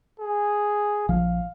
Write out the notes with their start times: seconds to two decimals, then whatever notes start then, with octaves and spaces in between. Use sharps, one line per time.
0.19 G#4
1.09 A#1 F3 F5